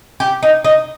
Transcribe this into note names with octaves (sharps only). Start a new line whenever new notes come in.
G4
D#4
D#4